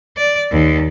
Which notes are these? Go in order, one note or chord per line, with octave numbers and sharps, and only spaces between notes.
D5
D#2